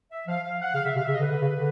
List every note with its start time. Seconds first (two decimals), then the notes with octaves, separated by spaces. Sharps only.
0.11 E5
0.27 F3 F5
0.44 F5
0.61 F#5
0.74 C#3 F5
0.84 C#3 E5
0.96 C3 F5
1.04 E5
1.08 C#3
1.14 D#5
1.20 D3 B4
1.31 D3
1.41 C#3
1.54 D3